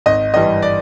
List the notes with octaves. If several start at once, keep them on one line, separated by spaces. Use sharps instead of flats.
G#1 D#5
G2 E3 G3 D#5
D5